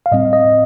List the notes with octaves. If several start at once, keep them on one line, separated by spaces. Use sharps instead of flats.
F5
A2 G3 C4 D#5
D#5